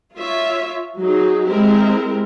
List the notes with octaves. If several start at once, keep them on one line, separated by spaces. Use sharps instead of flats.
F4 C#5 E5
F#3 D#4 G#4
G#3 C4 E4 G4 A#4